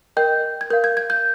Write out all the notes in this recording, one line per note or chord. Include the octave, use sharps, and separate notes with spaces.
A#4 D#5 G5 G6
G#6
A#4 F5 G6
G#6
G#6
G6